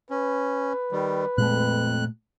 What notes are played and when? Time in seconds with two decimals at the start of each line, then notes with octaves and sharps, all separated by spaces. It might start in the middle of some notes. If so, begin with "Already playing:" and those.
0.10 C#4 B4
0.92 D#3 G3
1.38 F2 A#2 G#3 A3 F#6